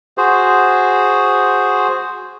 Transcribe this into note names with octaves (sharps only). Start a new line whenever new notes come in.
F#4 G#4 C5